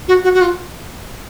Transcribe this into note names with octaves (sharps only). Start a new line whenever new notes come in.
F#4
F#4
F#4
F4